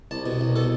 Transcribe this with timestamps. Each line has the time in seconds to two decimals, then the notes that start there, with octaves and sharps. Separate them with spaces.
0.11 C2 A5
0.26 B2
0.41 C2
0.56 B2 A4